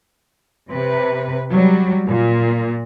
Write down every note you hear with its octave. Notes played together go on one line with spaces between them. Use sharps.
C3 B4
F#3 G3
A#2